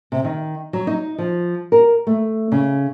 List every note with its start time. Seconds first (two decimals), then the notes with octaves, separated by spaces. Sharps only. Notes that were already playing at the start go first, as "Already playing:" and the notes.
0.12 C3
0.24 D#3
0.73 F#3
0.87 D#4
1.18 F3
1.72 A#4
2.07 A3
2.52 C#3